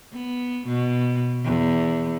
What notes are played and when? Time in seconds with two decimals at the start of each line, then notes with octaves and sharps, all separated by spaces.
0.13 B3
0.68 B2
1.45 E2